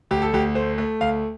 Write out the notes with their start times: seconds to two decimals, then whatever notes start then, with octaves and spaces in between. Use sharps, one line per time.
0.11 D2 G4
0.22 A4
0.33 D2 G4
0.55 A3 C5
0.78 A3
1.01 D2 F5